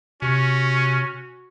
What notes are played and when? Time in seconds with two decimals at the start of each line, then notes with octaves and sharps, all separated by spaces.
0.22 C3 C#4 F#4